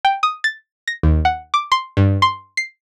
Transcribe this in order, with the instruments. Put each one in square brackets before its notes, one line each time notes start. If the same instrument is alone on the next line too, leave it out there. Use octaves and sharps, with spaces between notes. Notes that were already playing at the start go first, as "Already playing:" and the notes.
[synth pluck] G5
D#6
A6
A#6
D#2
F#5
D6
C6
G2
C6
C7